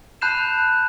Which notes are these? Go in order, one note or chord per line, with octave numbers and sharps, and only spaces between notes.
A5 B5 F#6 G6 C7 E7